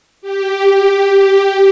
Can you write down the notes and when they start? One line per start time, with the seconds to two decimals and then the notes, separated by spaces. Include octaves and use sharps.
0.21 G4